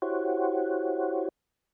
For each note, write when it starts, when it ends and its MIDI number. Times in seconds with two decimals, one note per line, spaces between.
0.02 1.28 64
0.02 1.28 66
0.02 1.28 67
0.02 1.28 72
0.02 1.28 73
0.02 1.28 78